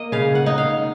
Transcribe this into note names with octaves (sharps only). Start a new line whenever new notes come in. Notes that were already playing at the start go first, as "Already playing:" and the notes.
Already playing: A#3 D#5
C#3 F5
F#5
D#4
F5